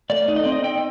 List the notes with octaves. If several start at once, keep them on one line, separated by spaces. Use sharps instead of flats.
A3 D5
D#4
D#5
C4 D5
D#5
C4 G5